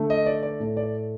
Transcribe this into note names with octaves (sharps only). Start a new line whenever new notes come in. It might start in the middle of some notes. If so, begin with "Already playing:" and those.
Already playing: D3 A3
D#5
D5
D5
A2 A3
D5